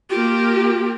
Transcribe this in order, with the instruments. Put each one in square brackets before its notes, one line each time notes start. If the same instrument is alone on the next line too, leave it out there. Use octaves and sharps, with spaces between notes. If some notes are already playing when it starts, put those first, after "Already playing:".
[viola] A#3 G4 [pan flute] F4